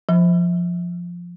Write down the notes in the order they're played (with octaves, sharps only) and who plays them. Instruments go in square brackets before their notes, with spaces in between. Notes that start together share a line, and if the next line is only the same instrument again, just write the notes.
[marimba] F3